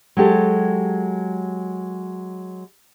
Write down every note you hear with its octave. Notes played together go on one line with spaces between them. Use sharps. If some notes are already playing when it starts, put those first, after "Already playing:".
F#3 G#3 G4 A4